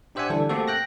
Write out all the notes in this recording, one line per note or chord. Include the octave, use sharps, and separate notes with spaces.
D4 G4 C5 E5 F#5 G#5
D3 E3 G3 D4 A4
A3 A#3 C4 F#4 G4 A4
G5 F#6 A#6